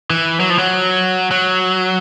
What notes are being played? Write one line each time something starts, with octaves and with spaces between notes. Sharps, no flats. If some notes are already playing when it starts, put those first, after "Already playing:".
E3
F#3
F3
F#3
F#3